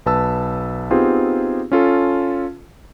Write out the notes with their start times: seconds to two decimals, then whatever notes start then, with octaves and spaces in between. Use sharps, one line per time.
0.06 B1 B4 A5 E6
0.91 B3 C4 D#4 F4 G4 G#4
1.72 C#4 F4 A4 A5